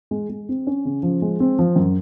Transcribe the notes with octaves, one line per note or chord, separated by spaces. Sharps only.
G#3
G#3
C4
C#4
C#3
F3
G#3
C4
F3
F#2